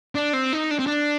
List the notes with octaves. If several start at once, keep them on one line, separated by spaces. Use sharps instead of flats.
D4
C4
D#4
D4
C4
D4